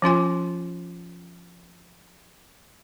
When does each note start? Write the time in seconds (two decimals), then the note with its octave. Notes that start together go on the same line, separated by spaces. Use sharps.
0.02 F3 C#4 F4 G#5